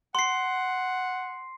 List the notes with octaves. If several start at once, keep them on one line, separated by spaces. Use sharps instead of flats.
F#5 C6 C7